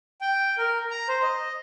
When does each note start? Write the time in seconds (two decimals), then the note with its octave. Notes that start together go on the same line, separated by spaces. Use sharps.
0.21 G5
0.58 A#4
0.90 A#5
1.08 C5
1.22 D#5